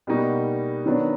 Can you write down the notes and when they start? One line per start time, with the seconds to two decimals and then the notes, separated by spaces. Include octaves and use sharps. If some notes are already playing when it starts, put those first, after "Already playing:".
0.07 B2 G3 A#3 D#4 F#4
0.86 D#3 F#3 B3 D4